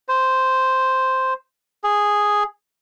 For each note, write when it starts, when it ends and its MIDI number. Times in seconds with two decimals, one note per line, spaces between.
0.08 1.34 72
1.84 2.43 68